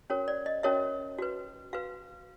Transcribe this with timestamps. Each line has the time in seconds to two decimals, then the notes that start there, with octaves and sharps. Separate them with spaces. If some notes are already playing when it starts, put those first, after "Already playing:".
0.10 C#4 F#4 A#4 C#5
0.28 D5
0.46 D#5
0.63 C#4 F#4 A#4 C#5 E5
1.18 F#4 B4
1.73 F#4 B4 F5